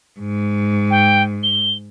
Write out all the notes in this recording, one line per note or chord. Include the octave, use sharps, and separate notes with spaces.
G#2
G5
G7